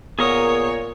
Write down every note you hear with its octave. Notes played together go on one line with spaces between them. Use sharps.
A#2 B3 G#4 A#4 C#5 F#5 D#6